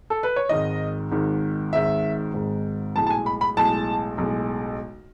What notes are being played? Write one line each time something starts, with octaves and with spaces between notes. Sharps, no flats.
A4
B4
C#5
G#1 G#2 D#3 D#5
G#1 G#2 D#3
G#1 G#2 D#3 E5
G#1 G#2 D#3
B1 A2 G#3 A5
A5
G#5
B5
B5
B1 A2 G#3 A5
B1 A2 G#3